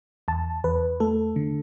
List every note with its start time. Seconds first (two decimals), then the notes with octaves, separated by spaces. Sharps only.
0.28 E2 A5
0.64 E2 B4
1.00 A3 A4
1.36 D3